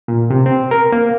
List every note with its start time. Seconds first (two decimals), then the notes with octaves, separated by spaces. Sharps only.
0.08 A#2
0.30 C3
0.46 C4
0.71 A#4
0.92 A#3